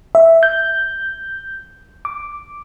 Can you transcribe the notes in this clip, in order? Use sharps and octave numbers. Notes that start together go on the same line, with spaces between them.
E5
G6
D6